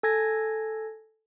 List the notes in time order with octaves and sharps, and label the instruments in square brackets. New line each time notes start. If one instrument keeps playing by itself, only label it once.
[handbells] A4 G#5 G#6 A#6